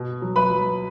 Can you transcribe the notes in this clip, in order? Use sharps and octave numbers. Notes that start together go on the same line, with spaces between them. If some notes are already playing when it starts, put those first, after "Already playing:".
Already playing: B2
F#3
B4 B5
F#3